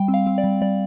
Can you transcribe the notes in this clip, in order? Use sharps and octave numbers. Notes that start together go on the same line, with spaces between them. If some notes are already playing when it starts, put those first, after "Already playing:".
Already playing: G3 G5
C4
F5
C4
D5
G3
G3 D5